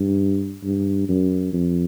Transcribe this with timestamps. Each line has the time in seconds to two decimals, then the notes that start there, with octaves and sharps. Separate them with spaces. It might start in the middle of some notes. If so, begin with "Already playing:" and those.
Already playing: G2
0.64 G2
1.09 F#2
1.53 F2